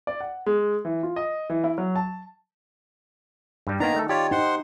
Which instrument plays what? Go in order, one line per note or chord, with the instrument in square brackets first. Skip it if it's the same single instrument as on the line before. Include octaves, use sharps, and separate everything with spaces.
[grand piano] D5
F#5
G#3
E3
F4
D#5
E3
E4
F#3
A5
[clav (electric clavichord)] G2 G3
[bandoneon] D#3 A#5 [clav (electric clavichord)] A#3 B3 D4 [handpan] D#4
[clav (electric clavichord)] A3 A4
[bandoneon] F4 C#5 D5 [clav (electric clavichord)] G4
[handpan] D#4 [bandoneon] C5 F#5 C6